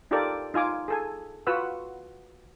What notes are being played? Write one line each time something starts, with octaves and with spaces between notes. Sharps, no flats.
D#4 F4 G4 A4 A#4 D5
D#4 F4 G#5 D6
G#4 A4 G#5
F4 F#4 B4 F#5 E6